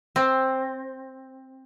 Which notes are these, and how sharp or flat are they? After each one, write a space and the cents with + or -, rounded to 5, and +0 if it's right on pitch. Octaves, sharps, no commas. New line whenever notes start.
C4 +10